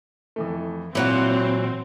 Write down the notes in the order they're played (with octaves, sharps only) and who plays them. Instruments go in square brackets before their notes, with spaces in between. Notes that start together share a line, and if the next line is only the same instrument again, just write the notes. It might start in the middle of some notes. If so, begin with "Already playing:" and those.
[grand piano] F2 E3 A3
[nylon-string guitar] A#2 [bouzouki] E3 F#3 C#5 [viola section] C4 [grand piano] E4 F#5